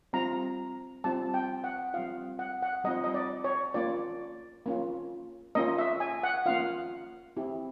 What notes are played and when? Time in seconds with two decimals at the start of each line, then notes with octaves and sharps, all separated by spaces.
0.13 G3 C4 F4 A#5
1.04 G3 C4 F4 A5
1.34 G5
1.64 F#5
1.94 G3 C4 F4 F5
2.39 F#5
2.63 F#5
2.84 G3 C4 F4 D#5
3.04 D#5
3.14 D5
3.44 C#5
3.74 A#3 C#4 F4 D5
4.66 A#3 C#4 F4
5.55 A#3 C#4 F4 D#5
5.78 E5
6.00 G#5
6.23 F#5
6.46 A#3 C#4 F4 F5
7.37 C4 E4 G4